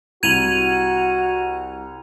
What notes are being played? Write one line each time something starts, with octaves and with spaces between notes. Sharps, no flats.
C2 F#4 G#6 D#7 F7 F#7